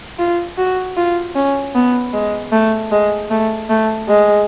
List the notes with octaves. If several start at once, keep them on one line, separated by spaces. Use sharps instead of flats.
F4
F#4
F4
C#4
B3
G#3
A3
G#3
A3
A3
G#3